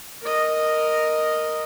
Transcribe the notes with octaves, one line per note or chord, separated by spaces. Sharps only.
A#4 D#5